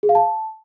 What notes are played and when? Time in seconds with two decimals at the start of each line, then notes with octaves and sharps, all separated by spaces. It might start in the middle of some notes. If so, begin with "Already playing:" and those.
0.03 G#4
0.09 F5
0.15 A5